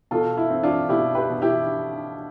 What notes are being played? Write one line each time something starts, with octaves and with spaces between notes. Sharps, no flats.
B2 F4 A4
E4
C4
D4 F4
B2 E4 G4
G4 B4
B2
E4 G4